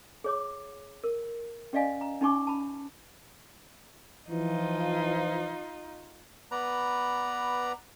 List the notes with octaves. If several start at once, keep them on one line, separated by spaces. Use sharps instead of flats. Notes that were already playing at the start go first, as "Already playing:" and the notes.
G#4 C#5 D6
A#4
C#4 G4 D5 D#5 F5 G#5
A#5
C#4 D#4 G4 G#5 C#6 D6
A5 B5
E3 F3 D#4 F4
B3 B4 D5 A#5